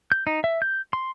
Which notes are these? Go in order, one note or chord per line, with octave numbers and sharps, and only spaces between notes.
G6
D#4
E5
G6
C6